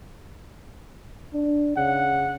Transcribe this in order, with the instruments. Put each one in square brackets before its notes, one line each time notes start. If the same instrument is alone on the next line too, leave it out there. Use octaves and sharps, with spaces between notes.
[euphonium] D4
[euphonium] C#3 [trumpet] F#5